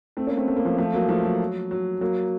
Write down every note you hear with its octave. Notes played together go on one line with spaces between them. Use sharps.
A3 C4
A#3 C#4
A3 C4
A3
A#3
F3 A3
F3 A3
F#3 A#3
F3 A3
F#3
F#3
F#3 A#3